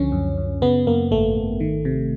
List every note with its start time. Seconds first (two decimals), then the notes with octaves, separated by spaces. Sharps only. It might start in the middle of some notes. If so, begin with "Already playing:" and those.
Already playing: C#2 D3 F3 C#4
0.12 F#2
0.38 F#2
0.62 C#3 B3
0.87 F#2 A#3
1.11 G#1 A3
1.36 G#1
1.60 D#3
1.85 C3